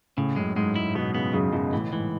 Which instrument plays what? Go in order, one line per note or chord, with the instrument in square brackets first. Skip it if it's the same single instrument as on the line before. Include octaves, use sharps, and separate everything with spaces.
[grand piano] A2 [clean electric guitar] C#3
[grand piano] F#2 [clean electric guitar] G#3
[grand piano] G#2 [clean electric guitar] G#3
[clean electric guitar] E4
[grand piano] B2 [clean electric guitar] B3
[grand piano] C#3 [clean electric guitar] B3
[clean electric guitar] F#2 [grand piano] C#3
[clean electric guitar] F#2 [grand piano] B2
[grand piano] A2 [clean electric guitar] E3
[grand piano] G#2 [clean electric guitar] E3